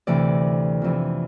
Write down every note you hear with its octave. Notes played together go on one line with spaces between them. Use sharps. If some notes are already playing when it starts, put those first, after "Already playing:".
D2 C3 E3 D5
F2 C3 E3